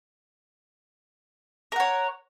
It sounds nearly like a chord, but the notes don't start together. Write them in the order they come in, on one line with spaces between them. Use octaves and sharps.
A#4 F#5 C#5